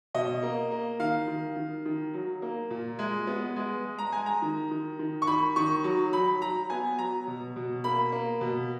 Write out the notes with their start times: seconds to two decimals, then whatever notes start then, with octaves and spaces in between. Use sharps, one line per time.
0.14 B2 D#5
0.43 A#3
0.71 A#3
1.00 D#3 F5
1.28 D#3
1.56 D#3
1.85 D#3
2.14 F#3
2.42 A#3
2.70 A#2
2.99 G#3
3.27 B3
3.56 G#3
3.85 G#3
3.98 A#5
4.12 G#3 G#5
4.26 A#5
4.42 D#3
4.71 D#3
4.99 D#3
5.22 C#6
5.27 D#3 B5
5.56 D#3 C#6
5.84 F#3
6.13 F#3 B5
6.42 F#3 A#5
6.70 B3 G#5
6.98 F#3 A#5
7.28 B2
7.56 B2
7.84 A#3 B5
8.12 A#3
8.41 B2